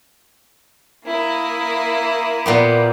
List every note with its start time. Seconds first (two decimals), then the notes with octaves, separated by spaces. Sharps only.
1.06 A#3 E4 D#6
2.46 A#2 B3 G4